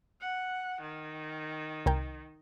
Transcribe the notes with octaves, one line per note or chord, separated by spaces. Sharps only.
F#5
D#3
C2 A#4 G5